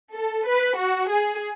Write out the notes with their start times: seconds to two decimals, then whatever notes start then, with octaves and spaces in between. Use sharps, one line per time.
0.14 A4
0.45 B4
0.77 F#4
1.08 G#4